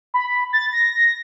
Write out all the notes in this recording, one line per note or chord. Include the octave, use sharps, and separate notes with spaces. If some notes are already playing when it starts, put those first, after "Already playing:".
B5
A6
A#6